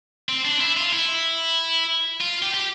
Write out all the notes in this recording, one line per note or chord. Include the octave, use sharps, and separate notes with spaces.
C4
D4
E4
F4
E4
F4
G4
G4